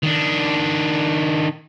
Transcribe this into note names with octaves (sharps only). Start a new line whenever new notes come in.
D#3 D4